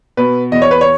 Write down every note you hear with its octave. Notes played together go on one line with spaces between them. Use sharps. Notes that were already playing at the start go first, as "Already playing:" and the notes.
B2 B4
E2 D#5
C#5
B4
C#5